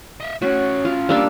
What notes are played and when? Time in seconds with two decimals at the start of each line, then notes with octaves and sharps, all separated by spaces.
0.21 D#5 E5
0.42 A3 C#4 F#4 C#5
0.85 F4
1.09 G3 A#3 D4 E6